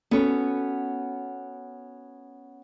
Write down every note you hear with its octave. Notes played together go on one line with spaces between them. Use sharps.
B3 C#4 F#4 A4 C#5